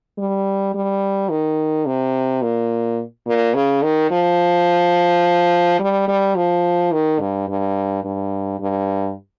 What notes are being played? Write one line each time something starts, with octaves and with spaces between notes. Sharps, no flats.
G3
G3
D#3
C3
A#2
A#2
C#3
D#3
F3
G3
G3
F3
D#3
G2
G2
G2
G2